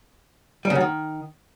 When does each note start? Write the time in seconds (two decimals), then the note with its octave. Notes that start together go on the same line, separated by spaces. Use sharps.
0.65 G3
0.70 C#3
0.75 F#2
0.81 D#3